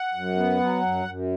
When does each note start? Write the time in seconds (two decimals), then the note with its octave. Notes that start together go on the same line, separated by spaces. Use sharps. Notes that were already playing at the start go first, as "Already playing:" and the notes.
Already playing: F#5
0.14 F#2
0.36 B3
0.60 F#3
0.82 F#2
1.05 F#2